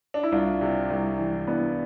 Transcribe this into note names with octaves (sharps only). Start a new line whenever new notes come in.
D4
E4
C2 D4 F4
C3
C2
E3
C2 B3 D4